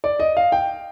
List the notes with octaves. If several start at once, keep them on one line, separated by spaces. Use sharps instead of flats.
D5
D#5
F5
G5